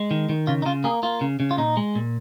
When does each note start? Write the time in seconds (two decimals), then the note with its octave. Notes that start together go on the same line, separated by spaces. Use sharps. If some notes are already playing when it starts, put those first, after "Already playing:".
Already playing: G#3
0.11 D#3
0.29 D#3
0.47 C#3 F4
0.62 D#4
0.66 C#3 F4
0.84 A#3 G#4
1.03 A#3 F4
1.21 C#3
1.40 C#3
1.51 F4
1.58 A#2 D#4
1.77 G#3
1.95 A#2